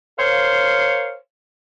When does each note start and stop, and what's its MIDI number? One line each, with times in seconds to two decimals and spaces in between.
0.19 1.15 70
0.19 1.15 72
0.19 1.15 73
0.19 1.15 77